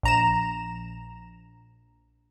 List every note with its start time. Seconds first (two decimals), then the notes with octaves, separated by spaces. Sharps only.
0.03 A#1 A#5 E7